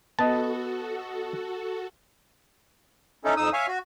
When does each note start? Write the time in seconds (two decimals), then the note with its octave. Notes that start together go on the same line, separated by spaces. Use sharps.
0.19 B3 F#4 A4 D#5 A5
3.25 C#4 D#4 E4 A4
3.37 F2 D#4 D#6 E6
3.53 C#5 E5 F5 G#5
3.68 F#4